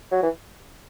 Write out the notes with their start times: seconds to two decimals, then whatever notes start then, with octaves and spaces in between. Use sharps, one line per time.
0.11 F#3
0.22 E3